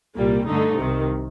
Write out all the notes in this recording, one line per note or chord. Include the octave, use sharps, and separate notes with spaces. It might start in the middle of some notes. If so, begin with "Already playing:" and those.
C2 A#2 G3 A#3
G2 D3 A3 D#4
C2 C3 D#3